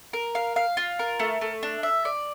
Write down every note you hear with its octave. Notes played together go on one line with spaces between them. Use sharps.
A#4
F5
F5
F4
A#4
A3
A3
D4
E5
D5